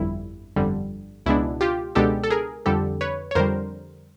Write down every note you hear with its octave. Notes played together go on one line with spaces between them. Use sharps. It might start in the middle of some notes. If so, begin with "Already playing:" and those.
Already playing: G1 F2 D3 G3 E4
G1 F2 D3 G3
C#2 B2 G#3 B3 D4 E4
F4 G4
C#2 B2 G#3 B3 D4 G4 A4
A4
G#4 A#4
F2 D3 G3 G4 A4
B4 C#5
C#5
F2 D3 G3 A#4 C5